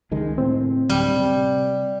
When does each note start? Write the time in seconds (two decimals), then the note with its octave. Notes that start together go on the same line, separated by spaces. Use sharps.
0.11 C#2 D#3 G#3
0.38 A2 C4
0.90 D1 G3
1.16 C3